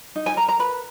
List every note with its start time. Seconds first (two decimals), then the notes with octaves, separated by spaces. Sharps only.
0.16 D#4
0.26 G#5
0.36 A#4 A#5
0.48 A#5
0.60 B4 B5